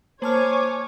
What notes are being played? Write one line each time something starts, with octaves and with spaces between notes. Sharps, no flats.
A#3 C5 C#5 G#5 A5 D6 F6